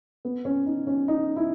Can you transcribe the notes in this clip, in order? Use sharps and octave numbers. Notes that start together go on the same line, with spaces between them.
B3
C#4
D#4
C#4
D#4
E4